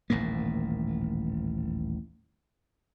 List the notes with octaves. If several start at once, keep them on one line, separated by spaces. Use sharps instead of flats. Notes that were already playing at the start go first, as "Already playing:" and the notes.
D#1 A1 G#2 A#3